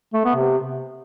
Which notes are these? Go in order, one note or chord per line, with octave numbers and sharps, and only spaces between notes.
A3
B3
C3